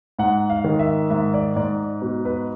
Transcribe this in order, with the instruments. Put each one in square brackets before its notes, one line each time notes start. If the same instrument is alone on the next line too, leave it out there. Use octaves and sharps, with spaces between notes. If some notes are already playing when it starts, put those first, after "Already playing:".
[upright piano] G#2 F#5
F5
D#3
E5
G#2 E5
D5
G#2 D5
B2
B4